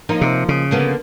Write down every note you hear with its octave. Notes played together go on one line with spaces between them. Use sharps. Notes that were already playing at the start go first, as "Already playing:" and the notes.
F3 A#3 D#4
C3
C#3
D3 A#3 B3